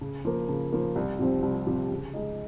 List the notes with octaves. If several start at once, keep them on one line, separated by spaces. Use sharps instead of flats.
C#3
F3 A#3
C#3
F3 A#3
C2
C3 F3 C4
C2
C3 F3 C4
C#3
G#3 D#4